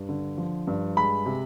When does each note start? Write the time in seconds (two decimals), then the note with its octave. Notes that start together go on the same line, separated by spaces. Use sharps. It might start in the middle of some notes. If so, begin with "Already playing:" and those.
Already playing: G2
0.09 D3
0.38 F3
0.67 G2
0.97 G#3 B5
1.26 C3